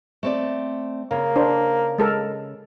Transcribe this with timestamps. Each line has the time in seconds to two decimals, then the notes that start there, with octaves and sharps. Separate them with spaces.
0.23 A3 C4 D5
1.11 C#3 A#3
1.36 D4 C5
1.98 G#3 A4 A#4